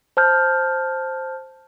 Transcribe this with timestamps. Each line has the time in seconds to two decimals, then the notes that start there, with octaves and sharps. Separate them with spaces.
0.17 C5 A5 F6 G6